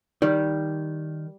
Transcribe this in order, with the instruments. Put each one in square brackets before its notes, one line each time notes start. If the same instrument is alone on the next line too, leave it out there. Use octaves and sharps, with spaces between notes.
[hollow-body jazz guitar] D#3 [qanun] G3